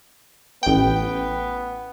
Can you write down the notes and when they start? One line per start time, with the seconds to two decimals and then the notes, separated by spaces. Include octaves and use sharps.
0.63 A1 B3 G5